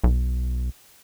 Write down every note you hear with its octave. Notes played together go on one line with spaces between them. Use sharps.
B1